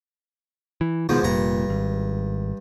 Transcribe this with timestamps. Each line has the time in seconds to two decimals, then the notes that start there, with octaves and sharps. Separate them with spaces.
0.81 E3
1.09 E2 G#2 B2 D#3 F3
1.23 F1 G2 A#2 A#5
1.69 G#1